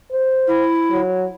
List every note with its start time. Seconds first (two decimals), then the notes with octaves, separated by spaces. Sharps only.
0.11 C5
0.47 E4
0.90 F#3